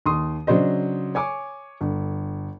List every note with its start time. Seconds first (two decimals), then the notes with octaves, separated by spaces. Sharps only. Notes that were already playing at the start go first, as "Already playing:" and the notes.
0.06 D#2 C6 D#6
0.47 C#3 F#3 D4 C5 D#5
1.15 C#5 G#5 D6
1.81 G1